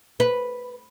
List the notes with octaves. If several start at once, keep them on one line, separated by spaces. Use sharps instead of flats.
B4